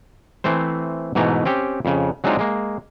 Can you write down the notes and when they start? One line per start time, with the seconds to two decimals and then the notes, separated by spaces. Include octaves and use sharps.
0.44 E3 A3 C4 C5
1.15 G#2 B2 E3 A3 A#5
1.45 C4 C#4 G4 G5
1.85 F2 C#3
2.24 F#3 G#3 C4 D4 D#4 F4
2.39 G#3 A#3